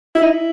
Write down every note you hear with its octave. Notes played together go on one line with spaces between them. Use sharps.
E4
D#4
E4